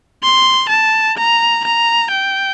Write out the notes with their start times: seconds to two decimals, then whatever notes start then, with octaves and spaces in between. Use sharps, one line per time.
0.23 C6
0.69 A5
1.18 A#5
1.65 A#5
2.11 G5